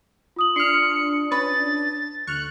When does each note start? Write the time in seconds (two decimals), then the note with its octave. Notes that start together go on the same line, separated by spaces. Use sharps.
0.36 F4 D#6 F#7
0.56 D4 C6 F6 C#7
1.31 C#4 B4 A6
2.27 D2 C#6 F6 F#6